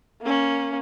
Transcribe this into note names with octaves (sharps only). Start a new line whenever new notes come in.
A#3 C#4